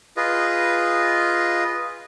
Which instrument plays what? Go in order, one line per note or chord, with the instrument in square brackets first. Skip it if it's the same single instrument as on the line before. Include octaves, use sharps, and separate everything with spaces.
[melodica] F4 G#4 B4 D#5